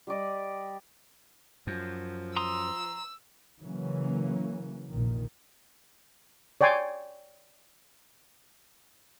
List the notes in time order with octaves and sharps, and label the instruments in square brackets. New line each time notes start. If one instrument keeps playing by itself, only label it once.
[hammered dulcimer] G3 G4 D5 D#5
[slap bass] F#2 [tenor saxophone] F3
[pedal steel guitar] A#5 C6 D#6 [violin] E6
[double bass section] C#3 E3 F#3 A#3 C#4
F1 A#1 A#2 D#3
[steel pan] C#5 D5 G5 G#5 C6